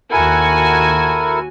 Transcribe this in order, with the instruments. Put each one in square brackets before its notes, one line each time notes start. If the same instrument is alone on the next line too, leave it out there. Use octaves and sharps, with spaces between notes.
[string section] D#2 F#4 G#5 [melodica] E4 A4 A#4